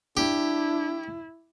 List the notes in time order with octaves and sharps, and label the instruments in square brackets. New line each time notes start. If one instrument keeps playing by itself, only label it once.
[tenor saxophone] D4 [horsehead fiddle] E4 [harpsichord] G4